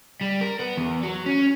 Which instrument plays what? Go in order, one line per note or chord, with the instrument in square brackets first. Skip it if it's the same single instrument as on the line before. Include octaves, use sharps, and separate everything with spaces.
[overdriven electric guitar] G3
A#4
B3
E2
F#3
C#4